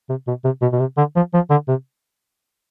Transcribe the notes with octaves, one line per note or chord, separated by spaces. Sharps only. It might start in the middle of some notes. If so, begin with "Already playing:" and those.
C3
B2
C3
B2
B2
C3
D3
F3
F3
D3
C3